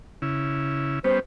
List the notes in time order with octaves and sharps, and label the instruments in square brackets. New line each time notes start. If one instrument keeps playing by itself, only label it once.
[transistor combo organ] C#3 E4
[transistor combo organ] G3 B3 C#4 [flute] C5